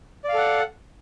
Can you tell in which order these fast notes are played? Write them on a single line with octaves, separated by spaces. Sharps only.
D5 F5 A4 F#5